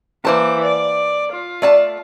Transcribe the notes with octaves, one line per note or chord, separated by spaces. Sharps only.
E3 A#3 C5 A5 D6
D5
F4
A3 D5 A5